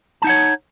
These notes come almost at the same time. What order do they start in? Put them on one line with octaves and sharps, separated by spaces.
A5 D#4 F#5 C#5